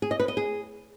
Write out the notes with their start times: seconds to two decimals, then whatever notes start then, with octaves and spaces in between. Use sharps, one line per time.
0.02 G#4
0.11 D#5
0.20 B4
0.28 D#5
0.37 G#4